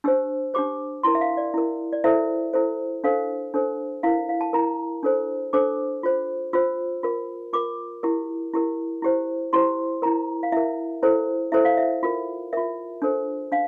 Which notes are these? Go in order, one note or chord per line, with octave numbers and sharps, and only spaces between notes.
D4 G4 C5 E6
D4 G4 C5 D6
E4 A#4 C6
E5
F5
D5
E4 A#4
D5
E4 A4 C5 E5
E4 A4 C5
D4 A4 C5 F5
D4 A4 C5
E4 A#4 F5
F5
A5
E4 A#4 A#5
D4 A4 C5
D4 A4 C5 D6
F4 C5
F4 C5 E6
F4 A#4
F4 A#4 D6
E4 G4 A#4
E4 G4 A#4
E4 G4 C5
E4 G4 C5 C6
E4 A#4 A#5
F5
E4 A#4 E5
E4 A4 C5
E4 A4 C5 E5
F5
E5
F4 A#4
F4 A#4 E5
D4 A4 C5
D4 F5